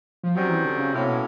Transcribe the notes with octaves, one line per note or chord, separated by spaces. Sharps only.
F3
F#2 D#3 F#3 G3 C4
E3
D3
C#3
A2 C3 F#3 A#3 C#4
B2